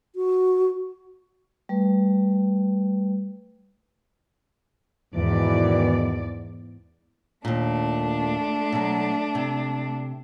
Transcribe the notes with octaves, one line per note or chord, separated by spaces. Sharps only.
F#4
G3 A3 B4
E2 G#2 B2 D#3 E3 D5
D#2 A#2 A3 D4
B2 F#3
C3